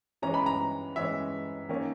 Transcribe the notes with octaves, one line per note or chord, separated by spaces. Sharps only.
E3 G#3 C#4 A#5
B5
A#5
E3 G#3 C#4 E5
D#3 A#3 C#4